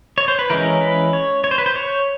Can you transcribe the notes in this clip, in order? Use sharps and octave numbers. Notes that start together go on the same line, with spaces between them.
C#5
C5
B4
E3 G#3 C#4 A#4
B4
C#5
C#5
C5
B4
C5
C#5